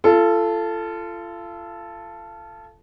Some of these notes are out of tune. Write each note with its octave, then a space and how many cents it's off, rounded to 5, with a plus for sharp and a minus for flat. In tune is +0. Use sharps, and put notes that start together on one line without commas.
F4 -30 A4 +0